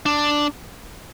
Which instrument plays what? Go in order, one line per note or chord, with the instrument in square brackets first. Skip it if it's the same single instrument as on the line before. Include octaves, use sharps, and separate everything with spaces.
[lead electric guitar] D4